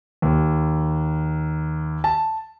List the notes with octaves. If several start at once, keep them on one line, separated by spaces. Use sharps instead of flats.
D#2
A5